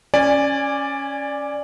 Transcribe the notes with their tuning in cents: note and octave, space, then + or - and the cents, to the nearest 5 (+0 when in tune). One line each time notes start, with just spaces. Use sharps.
C#4 +0 D5 +0 G#5 -20